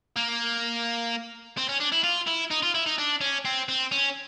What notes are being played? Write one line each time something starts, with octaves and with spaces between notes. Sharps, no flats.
A#3
C4
C#4
D4
E4
F4
E4
D#4
F4
E4
D#4
D4
C#4
C4
C4
C#4